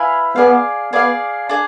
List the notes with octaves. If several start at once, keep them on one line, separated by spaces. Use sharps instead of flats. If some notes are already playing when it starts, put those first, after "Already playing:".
Already playing: E4 B4 F5 G#5
B3 G#4 D5 F5
B3 G#4 D5 F5
D4 G#4